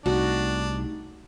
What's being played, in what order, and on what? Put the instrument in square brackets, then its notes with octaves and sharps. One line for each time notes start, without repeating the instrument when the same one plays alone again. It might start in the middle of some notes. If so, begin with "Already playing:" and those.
[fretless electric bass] C2 [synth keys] A3 D#4 G4 [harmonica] D4 [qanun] F#4